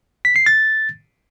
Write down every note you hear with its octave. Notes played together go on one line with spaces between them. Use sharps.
B6
C7
A6